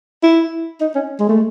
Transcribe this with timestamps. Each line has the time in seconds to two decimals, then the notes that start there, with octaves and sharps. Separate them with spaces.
0.23 E4
0.81 D#4
0.95 C#4
1.20 G#3
1.29 A3